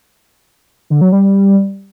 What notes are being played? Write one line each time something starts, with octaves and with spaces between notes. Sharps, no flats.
D3
F#3
G3